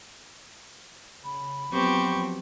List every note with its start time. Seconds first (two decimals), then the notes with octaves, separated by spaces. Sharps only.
1.24 C#3 B5
1.73 F3 F#3 B3 C4 G4 C#6